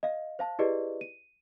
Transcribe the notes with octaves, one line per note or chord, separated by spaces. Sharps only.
D#5 F5
C5 F5 A5
E4 G4 G#4 B4 D5 D#5
D#7